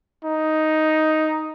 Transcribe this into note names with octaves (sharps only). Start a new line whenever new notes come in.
D#4